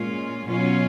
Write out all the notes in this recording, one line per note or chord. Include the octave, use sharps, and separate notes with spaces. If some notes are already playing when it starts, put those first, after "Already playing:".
Already playing: A#2 G#3 C#4 F4
B2 F#3 C#4 F4